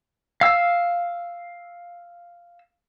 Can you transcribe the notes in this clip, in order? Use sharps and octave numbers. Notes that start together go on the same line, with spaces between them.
F5 E6